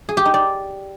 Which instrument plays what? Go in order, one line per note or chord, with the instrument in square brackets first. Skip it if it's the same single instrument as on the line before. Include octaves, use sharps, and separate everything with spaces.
[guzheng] G#4
G4
D#4
D5